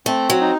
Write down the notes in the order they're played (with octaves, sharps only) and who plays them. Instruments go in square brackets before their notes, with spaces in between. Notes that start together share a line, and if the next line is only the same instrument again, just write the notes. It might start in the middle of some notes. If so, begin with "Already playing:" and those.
[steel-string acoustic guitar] A3 [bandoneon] C4
[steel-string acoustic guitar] F#3
[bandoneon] D#4